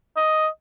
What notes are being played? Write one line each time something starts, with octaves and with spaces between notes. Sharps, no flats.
D#5